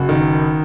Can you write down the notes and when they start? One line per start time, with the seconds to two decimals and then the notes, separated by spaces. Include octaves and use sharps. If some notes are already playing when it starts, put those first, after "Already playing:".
Already playing: F#1 F#4
0.09 D#3